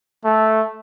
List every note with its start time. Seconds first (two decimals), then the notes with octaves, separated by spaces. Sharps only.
0.25 A3